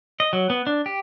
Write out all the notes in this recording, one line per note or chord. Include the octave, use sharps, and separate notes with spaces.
D#5
F#3
B3
D4
G4